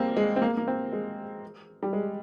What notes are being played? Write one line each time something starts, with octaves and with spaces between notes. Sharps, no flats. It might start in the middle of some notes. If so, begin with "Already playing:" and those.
Already playing: G3 A#3 C4
G#3
C4
A#3
A#3
C4
G#3
G3
G#3